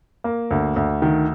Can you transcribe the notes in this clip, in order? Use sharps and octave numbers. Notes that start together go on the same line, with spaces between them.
A#3
D2
D2
D#3